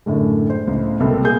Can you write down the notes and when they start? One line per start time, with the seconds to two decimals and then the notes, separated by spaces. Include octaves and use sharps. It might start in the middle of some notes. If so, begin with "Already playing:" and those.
0.06 F#2 A2 D3 G#3
0.50 C5
0.67 C#2 A2
1.00 C2 B2 A#3 C4 A4 B5
1.24 A#2 G#4 G6